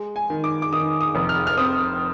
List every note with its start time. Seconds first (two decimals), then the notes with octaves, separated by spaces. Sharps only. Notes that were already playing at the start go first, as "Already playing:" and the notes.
Already playing: G#3
0.16 G#5
0.30 D#3
0.44 D6
0.62 D6
0.72 D#3 D#6
1.01 D#6
1.15 F1
1.29 F6
1.47 F6
1.57 C4 D#6